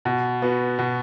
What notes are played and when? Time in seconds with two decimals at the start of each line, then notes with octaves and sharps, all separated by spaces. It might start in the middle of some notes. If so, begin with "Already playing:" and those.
0.05 B2
0.42 B3 F#4
0.79 B2